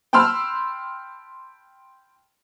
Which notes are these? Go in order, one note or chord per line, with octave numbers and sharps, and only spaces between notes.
G5 A5 B5 C6 E6 F6